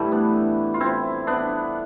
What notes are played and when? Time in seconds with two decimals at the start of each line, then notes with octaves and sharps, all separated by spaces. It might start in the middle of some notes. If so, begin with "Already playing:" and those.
Already playing: A2 E3 G3 A3 E4
0.12 B3 D4
0.74 F4
0.80 C4 E4
1.27 B3 D4